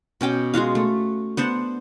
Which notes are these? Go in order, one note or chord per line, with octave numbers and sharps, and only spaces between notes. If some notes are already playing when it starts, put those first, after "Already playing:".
B2 C#4 G5 D6
G#3 F4 F#4 F5
A3
B3 D4 C5 F#5